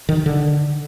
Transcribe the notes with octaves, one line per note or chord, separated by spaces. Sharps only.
D#3
D3